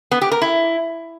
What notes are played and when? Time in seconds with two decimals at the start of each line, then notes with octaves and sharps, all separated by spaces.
0.11 B3
0.21 G4
0.32 A#4
0.42 E4